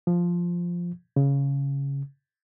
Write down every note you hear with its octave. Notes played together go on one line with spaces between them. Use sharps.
F3
C#3